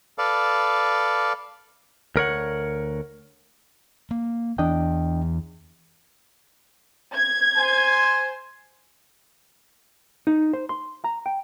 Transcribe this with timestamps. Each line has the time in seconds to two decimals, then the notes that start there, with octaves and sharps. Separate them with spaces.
0.18 A4 B4 D5 F5
2.16 D2 A#4 C#5 F#5
4.11 A#3
4.58 E2 E3 D4 D#5 G5
7.15 G#6
7.57 C5 G#5
10.27 D#4
10.53 C5
10.69 C6
11.04 A#5
11.26 G5